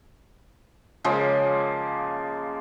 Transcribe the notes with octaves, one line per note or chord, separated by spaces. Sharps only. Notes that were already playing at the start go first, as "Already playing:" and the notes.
C#3 F3 G#3 A#3